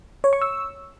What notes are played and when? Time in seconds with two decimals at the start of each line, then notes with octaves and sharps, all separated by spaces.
0.24 C#5
0.33 C#6
0.42 E6